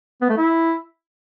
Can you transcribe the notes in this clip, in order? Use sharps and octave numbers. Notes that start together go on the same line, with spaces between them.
B3
A3
E4